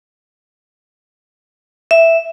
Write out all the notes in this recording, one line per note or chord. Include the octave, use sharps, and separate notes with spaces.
E5